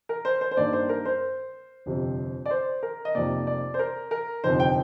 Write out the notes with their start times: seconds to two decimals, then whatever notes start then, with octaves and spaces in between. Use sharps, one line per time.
0.09 A#4
0.25 C5
0.41 C5
0.51 C5
0.57 G2 D#3 A#3 D5
0.73 C5
0.89 A#4
1.05 C5
1.86 G1 F2 C3 G3
2.46 D5
2.51 C5
2.83 A#4
3.05 D#5
3.15 F1 F2 C3 D#3 A#3 D5
3.47 D5
3.74 C5
3.79 A#4
4.11 A#4
4.43 G1 F2 C3 D#3 C5
4.60 G5